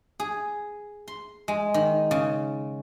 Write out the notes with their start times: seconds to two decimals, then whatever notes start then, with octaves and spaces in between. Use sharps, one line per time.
0.20 G#4
1.08 C6
1.48 G#3
1.74 D#3
2.11 C#3